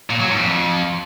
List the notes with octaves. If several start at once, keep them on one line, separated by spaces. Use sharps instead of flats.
A#2
F#3
G#2
F2